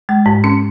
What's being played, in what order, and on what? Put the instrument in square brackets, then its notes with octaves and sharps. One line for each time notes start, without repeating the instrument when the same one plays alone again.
[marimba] G#3
G#2
C#4